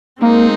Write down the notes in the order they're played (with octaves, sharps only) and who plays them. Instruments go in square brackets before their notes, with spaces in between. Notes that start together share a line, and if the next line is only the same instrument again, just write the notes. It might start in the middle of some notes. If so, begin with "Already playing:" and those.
[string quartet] G#3 C4 D#4 [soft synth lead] A#3